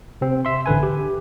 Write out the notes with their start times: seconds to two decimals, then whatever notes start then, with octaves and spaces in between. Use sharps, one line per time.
0.21 C3 C4
0.45 E5 C6
0.66 A1 D3 B4 G#5
0.83 G4